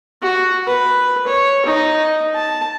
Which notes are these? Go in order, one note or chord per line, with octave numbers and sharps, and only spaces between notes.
F#4
B4
C#5
D#4
A5